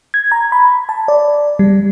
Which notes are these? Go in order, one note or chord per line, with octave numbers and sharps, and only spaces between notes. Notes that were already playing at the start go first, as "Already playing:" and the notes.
G#6
A#5
B5
A5
D5
G3